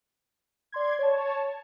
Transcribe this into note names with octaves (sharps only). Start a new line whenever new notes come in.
D5 C6 G#6
C#5 A5